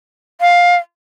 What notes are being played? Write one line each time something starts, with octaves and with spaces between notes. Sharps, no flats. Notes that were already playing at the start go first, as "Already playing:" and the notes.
F5